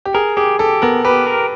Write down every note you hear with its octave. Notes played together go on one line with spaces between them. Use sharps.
G4
G#4 A#4
G4 G#4
G4 A4
B3 A#4
G4 B4
A#4